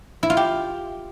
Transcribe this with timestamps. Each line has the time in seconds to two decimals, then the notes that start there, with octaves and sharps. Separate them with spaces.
0.23 E4
0.30 F4
0.37 G4